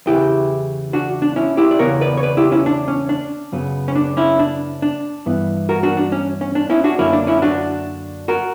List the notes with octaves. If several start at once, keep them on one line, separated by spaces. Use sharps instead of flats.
E2 C#3 E3 E4 G4
D4 F#4
D4
C#4 E4
E4 G4
D5
E2 C#3 E3 B3 A#4 C#5
B4 D5
C#5
B4 D5
E4 G4
C#4 E4
D4
C#4
D4
F#2 C#3 F#3 B3
C#4
D4
C#4 E4
D4
D4
G2 E3 B3
F#4 A#4
D4 F#4
D4
C#4
C#4
D4
C#4 E4
D4 F#4
F#2 D3 F#3 A#3 C#4 E4
D4
C#4 E4
D4 F#4
F#4 A#4